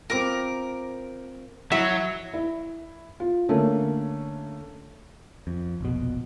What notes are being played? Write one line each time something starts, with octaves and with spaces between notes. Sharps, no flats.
C4 F4 A#4 D6
F#3 E4 E5 F#5
E4
F4
D3 A3 A#3 C#4
F2
F1 A#1 B2